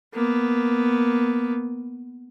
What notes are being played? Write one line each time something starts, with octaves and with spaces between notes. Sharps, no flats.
A#3 B3